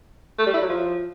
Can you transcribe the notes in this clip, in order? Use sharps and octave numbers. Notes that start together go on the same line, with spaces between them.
A3
G3
E4
F#3
F3